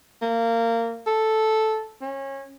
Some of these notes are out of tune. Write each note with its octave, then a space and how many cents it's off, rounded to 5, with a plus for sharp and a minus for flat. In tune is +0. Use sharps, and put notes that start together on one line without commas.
A#3 -20
A4 -5
C#4 -25